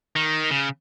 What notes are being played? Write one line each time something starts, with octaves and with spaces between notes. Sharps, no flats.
D#3
C#3